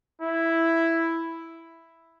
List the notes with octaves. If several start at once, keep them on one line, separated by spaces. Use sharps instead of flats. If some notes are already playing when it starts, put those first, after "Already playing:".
E4